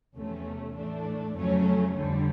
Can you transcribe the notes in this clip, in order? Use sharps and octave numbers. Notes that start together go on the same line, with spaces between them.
E2 C3 F3 A3 C#4
A2 E3 A3 D4
F2 C#3 F#3 A3 C#4
F2 D3 G3